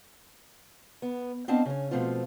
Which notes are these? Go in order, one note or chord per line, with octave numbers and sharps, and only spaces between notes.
B3
B3 C4 D4 D#5 F5 A5
C#3 C#4
B2 F3 A3 C4 F4